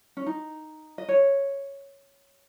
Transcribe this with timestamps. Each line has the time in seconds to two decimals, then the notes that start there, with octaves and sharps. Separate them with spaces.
0.17 C#4
0.26 D#4
0.98 D#5
1.09 C#5